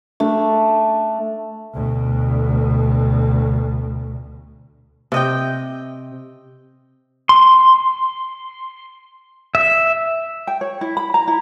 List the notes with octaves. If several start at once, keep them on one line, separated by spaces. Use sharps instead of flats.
A3 D4
D2 B2
C3 D#5 G5
C6
E5
G5
C#5
E4
B5
A#5
E4